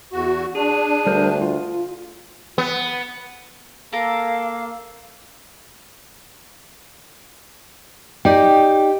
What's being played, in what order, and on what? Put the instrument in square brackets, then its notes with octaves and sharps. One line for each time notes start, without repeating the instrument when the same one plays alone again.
[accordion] E2 F#4
[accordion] D4 [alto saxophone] G#4
[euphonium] D2 [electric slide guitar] G3 A#4 C5
[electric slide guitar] F4
[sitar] B3
[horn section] A#3 [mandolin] A4 A#4 [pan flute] F5
[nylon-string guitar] D#4 D5 [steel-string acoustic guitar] G4 [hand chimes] G5